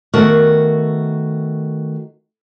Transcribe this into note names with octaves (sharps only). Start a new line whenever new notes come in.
D#3 A3 B3 F#4 A#4 A5